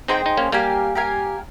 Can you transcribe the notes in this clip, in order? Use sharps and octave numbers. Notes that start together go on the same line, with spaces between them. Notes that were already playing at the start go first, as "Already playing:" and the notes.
C4 D#4 G#4 C5 G5
D#4
A#3 C#4
G3 A#3 G4 A#4 F5 G#5
G4 A#4 F5 G#5